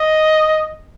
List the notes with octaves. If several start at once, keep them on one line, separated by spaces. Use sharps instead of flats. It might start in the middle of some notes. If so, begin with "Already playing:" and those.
Already playing: D#5